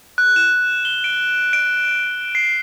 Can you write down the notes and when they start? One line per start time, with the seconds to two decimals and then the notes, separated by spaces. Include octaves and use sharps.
0.18 F#6
0.36 E7
0.85 G7
1.04 D7
1.53 D7
2.35 C7